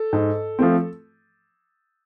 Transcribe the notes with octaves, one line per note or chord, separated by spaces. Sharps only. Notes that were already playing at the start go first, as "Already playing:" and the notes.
Already playing: A4
G#2
F3 A3 C4